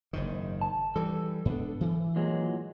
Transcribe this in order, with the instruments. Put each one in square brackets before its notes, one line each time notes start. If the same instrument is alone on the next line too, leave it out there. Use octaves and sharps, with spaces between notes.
[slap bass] F#1 G#2 D#3
[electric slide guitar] A5
[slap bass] E3 G3 [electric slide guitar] A4
[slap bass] G#2 B3 D4
E3
[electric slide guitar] A#2 F#3 G#3